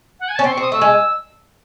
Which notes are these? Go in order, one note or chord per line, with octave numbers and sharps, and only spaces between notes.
F#5
G#5
C#4 A5
C4 C6
C#6
C4 D#6
A3 E6
G#3